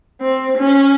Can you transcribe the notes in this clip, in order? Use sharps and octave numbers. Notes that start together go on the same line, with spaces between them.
C4
C#4